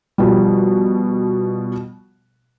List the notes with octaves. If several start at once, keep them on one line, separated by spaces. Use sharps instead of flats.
B2 F3 G3